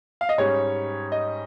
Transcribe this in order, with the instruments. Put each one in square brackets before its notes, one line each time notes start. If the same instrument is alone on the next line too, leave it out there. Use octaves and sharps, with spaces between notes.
[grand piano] F5
D#5
G#2 G3 C#4 C#5
D#5